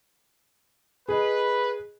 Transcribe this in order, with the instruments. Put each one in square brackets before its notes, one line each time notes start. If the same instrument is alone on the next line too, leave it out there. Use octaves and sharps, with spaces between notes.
[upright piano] G#4 D#5 [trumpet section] B4